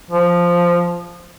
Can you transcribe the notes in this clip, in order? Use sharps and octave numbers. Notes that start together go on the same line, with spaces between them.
F3